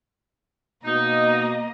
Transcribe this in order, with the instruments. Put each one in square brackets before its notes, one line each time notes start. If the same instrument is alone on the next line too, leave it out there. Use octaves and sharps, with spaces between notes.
[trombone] B2 [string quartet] A#3 D#5 A#5 [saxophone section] D#4